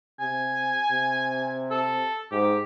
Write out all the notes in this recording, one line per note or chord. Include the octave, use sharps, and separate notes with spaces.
C3 G#5
C3
A4
G#2 G4